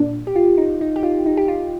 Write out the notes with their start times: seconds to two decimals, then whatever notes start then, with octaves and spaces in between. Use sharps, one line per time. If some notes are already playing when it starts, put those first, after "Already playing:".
Already playing: A#2 D4
0.27 G4
0.36 F4
0.58 D#4
0.81 D#4
0.96 G4
1.03 F4
1.26 D#4
1.37 G4
1.48 F4